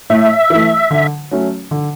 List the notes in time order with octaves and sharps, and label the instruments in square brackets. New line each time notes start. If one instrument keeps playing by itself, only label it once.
[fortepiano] A2 [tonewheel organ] E5
[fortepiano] E3 A3
D3
F#3 A3 C#4
D3